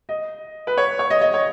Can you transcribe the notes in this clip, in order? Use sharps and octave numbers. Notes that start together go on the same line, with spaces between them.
D#5
B4
C#5
C#5
D#5
D#5
C#5